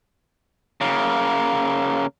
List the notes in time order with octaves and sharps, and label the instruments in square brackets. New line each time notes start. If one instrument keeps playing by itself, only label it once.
[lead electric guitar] C#3 A#3